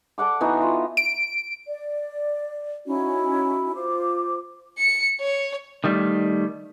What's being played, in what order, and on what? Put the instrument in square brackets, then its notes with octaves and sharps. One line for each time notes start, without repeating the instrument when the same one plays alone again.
[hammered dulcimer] A4 D5 F#5 D6
E3 B3 D#4 F#4
F4
[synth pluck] D7
[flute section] D5
C#4 D#4 E4 F#4
F4 C5 D6
[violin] C#7
C#5
[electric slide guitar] D#3 G3 A3